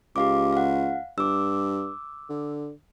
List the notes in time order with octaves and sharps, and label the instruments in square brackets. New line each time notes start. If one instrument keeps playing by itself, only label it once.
[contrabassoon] C#2 [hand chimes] G4 F5 D6
[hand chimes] F5 F#5
[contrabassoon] G2 [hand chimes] D6 E6
[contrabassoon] D3